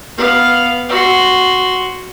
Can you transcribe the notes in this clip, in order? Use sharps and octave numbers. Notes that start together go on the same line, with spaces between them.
B3 F5
F#4 C6